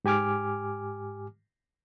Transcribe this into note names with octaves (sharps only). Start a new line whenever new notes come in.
G#2 G4 G#5 D6 F6